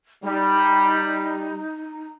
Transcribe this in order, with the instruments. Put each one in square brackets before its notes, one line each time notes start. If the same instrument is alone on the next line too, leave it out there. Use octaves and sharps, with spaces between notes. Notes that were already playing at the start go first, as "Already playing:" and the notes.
[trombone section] G3 [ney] D#4